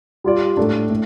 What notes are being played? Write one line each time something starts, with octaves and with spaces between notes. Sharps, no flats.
G3 F4 D5
A2 A3 D4
A2